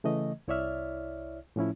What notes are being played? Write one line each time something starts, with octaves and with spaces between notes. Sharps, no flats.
C#3 E3 A3 D#5
C2 E4 C#5 D5 E5 F6
A2 F3 C#4 E4